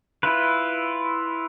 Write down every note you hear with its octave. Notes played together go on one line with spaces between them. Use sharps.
E4 F4 B4